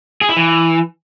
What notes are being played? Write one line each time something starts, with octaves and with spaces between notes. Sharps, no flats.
G#4
E4
E3